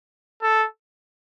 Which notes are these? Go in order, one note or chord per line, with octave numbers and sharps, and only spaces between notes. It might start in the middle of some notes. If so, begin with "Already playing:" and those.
A4